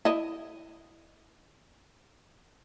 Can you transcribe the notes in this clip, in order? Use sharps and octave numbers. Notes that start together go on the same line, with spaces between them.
E4 D#5